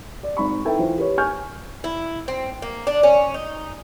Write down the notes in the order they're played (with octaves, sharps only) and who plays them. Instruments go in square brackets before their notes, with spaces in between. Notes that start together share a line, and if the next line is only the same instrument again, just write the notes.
[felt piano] D5
G#1 G#2 B5 C#6
D#4 E4 A4 B4 E5 G5
E3 F4 C5
G4 B4 C#5
G#5 C#6 F6 G6
[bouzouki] E4
C4
A#3
D4
C#4
D#4